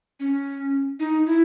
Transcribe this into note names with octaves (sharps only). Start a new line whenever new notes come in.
C#4
D#4
E4